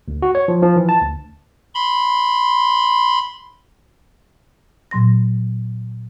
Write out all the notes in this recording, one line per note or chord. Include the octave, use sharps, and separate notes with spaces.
D2
F#4
C#5
F3
F3
E3
A5
D2
B5 C6
A#2 F#3 C6 A#6